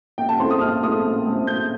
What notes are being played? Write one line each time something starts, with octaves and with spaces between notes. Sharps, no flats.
A#1 G5
A5
A2 A3 C4 C6
D#6
A#1 F6
A2 A3 C4 D#6
A#1
A2 A3 C4
A#1 G6